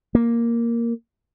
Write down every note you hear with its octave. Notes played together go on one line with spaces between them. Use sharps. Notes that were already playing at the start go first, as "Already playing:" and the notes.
A#3